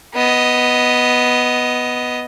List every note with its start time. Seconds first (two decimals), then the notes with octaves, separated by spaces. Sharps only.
0.14 B3 D#5